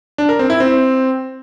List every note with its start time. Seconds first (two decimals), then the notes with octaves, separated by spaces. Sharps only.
0.18 D4
0.29 A#4
0.39 C4
0.50 E4
0.60 C4